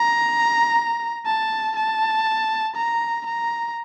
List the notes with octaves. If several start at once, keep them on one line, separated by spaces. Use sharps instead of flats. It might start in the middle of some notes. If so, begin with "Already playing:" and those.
Already playing: A#5
A5
A5
A#5
A#5